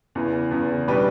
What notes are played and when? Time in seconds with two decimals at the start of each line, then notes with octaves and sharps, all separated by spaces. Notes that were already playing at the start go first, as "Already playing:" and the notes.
0.15 E2 C#3 E3
0.51 E2 C#3 E3
0.88 B2 G3 D4 G4 B4